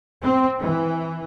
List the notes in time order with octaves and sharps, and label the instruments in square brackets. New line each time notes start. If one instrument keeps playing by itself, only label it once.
[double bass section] C4
E3